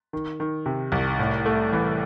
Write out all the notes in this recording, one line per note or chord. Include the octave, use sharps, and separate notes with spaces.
D#3
D#3
C3
C2
A2
A3
E3